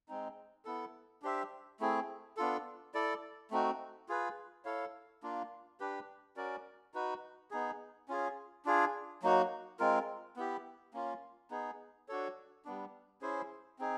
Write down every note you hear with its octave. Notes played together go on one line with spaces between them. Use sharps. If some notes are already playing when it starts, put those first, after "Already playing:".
G#3 C4 D#4
B3 E4 A4
D4 G4 C5 E5
A3 C4 E4 G#4
B3 D4 F4 A4
E4 A4 D5
A3 C4 D#4 F#4
F4 G#4 B4
E4 A4 C#5 F5
A#3 D4 F4
D4 G4 B4
C#4 F#4 A#4 D5
D#4 F#4 B4
B3 D#4 G#4
C#4 F4 G#4
D4 F4 G#4
F#3 A#3 D#4 F#4
G#3 C4 F4 A#4
B3 E4 G4
A#3 C#4 F4
B3 D#4 G#4
D4 F#4 A4 C#5
G3 B3 D4
C#4 E4 G#4 C5
C4 D#4 G#4